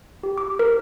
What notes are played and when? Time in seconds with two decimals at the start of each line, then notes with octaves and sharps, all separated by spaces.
0.23 G4
0.38 D6
0.59 A#4